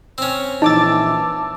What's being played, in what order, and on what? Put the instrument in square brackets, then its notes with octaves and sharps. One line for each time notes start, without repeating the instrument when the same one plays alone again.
[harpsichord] C4 C#4
[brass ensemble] A#1 E3 [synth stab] D#4 A6 [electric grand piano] A5 D6 E6